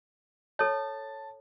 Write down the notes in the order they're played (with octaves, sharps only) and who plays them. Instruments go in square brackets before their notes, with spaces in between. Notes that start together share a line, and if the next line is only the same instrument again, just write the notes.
[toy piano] A4 C#5 [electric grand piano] A5